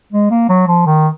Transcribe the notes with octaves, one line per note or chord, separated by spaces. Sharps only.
G#3
A#3
F#3
F3
D#3